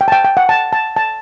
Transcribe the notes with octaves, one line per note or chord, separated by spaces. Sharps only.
G5
A5
G5
G5
F#5
A5
A5
A5